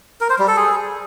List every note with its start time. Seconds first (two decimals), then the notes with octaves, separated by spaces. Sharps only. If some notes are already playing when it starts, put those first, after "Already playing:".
0.21 A#4
0.30 C5
0.39 G3
0.48 A4
0.57 G#4